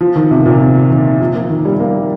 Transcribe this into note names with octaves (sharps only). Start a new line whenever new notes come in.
F3
D#3
C3
A#2
C3
D#3
F3
A#3
D#3
G3
G3
A#3